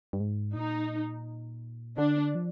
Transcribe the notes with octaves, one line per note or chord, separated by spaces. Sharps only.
G2
G#2
A#2 D#4
D3 D4
F3